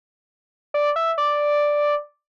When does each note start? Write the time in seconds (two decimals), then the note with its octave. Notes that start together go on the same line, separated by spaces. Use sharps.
0.74 D5
0.96 E5
1.18 D5